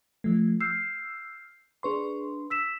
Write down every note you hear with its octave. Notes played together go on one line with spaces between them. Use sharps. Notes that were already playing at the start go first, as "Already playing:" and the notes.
F3 A3
E6 F6 G6 C7
D4 G#4 B4 C6 C#6
E6 B6 E7